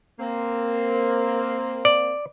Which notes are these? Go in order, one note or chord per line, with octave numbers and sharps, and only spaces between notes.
A#3 C4
D5